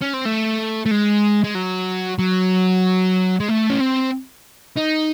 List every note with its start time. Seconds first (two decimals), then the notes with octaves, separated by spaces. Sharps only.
0.02 C#4
0.14 C4
0.26 A3
0.86 A3
0.91 G#3
1.44 G#3
1.55 F#3
2.19 F#3
3.40 G#3
3.49 A3
3.70 C#4
3.80 C4
4.76 D#4